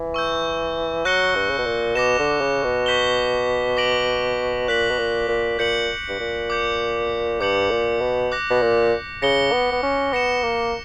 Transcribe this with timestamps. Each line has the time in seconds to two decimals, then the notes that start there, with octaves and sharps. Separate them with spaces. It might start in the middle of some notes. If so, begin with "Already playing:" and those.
Already playing: E3
0.14 C#6 E6 G6
1.05 F#3 C#6 F#6 A#6 C#7 G7
1.36 G2
1.50 C#3
1.58 B2
1.66 A#2
1.95 B2 D6 A#6 E7
2.19 D3
2.41 C#3
2.64 B2
2.86 C#6 G6 B6 E7 G7
3.77 D6 A#6 D7 F#7
4.68 A#2 F#6 B6 F#7
4.90 B2
4.99 A#2
5.28 A#2
5.59 A#2 G6 C#7 F#7
6.09 G2
6.20 A#2
6.50 D6 G6 C#7
7.40 G2 D6 G6 C#7 F#7
7.71 A#2
8.01 B2
8.32 D6 F#6 A#6
8.50 B2
8.62 A#2
9.22 C#3 A#6 C#7 G7
9.52 B3
9.72 B3
9.83 C#4
10.13 B3 A#6 C#7 E7
10.43 A#3